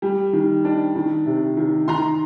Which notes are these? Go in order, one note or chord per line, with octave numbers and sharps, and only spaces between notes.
G3
D#3
D4
D#3
C3
D#3
D#3 A#5 C6